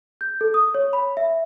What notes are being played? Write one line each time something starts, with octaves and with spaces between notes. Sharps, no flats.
G6
A4
D#6
C#5
B5
E5